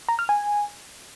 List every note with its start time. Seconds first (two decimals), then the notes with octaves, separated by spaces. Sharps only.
0.09 A#5
0.19 F6
0.29 G#5